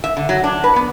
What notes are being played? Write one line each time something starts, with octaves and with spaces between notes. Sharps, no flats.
E5
D3
F#3
D4
B4
B3